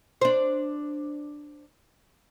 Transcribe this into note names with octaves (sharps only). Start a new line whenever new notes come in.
D4 C5